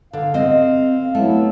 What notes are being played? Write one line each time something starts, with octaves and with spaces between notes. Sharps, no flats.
D3 F5
C4 D#5
F#3 A3 B3 E4